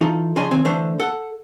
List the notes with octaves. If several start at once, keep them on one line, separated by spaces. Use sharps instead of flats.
E3 D#4 F4 A4
C#3 F3 D4 D#5 G#5 C6
B1 D#3 C4 G#5
D3 E3 A3 D4 C5
A4 F#5